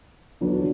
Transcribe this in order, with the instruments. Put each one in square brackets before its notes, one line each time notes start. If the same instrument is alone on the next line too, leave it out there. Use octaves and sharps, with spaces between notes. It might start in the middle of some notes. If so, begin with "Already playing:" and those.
[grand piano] E2 D3 F#3 B3 D4